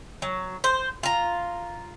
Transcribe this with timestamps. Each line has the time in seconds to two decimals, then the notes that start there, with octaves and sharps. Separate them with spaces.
0.22 F#3
0.64 C5
1.03 F4 A#5